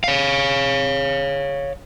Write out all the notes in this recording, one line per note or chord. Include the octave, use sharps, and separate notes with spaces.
C#5 F5